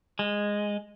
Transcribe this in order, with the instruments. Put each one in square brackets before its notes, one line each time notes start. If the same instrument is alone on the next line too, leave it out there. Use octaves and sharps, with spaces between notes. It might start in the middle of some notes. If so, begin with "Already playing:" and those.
[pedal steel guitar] G#3